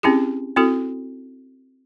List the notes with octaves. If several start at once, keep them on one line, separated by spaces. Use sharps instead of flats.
C4 C#4 E4 G4 G#4
C4 E4 F#4 A4